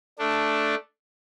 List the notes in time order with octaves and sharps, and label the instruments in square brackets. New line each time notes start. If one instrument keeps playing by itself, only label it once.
[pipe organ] A3 D4